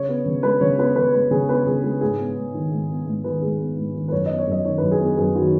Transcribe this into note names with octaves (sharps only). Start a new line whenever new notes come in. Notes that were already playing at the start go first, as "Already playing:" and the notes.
Already playing: C#3 C#5
B3
C#3
G#3 B4
C#3 C#5
B3 B4
C#3 B4
G#3 B4
C#3 G#4
B3 B4
C#3 G#4
G#3 G#4
G#2 G#4
B3
G#2
D#3
G#2
B3
G#2
D#3 B4
G#2 G#4
B3
G#2
D#3
B4
F#2 C#5
D#5
B3
C#5
F#2 D#5
D#3 C#5
F#2 B4
G#4
B3
G#4
F#2 G#4
D#3 F#4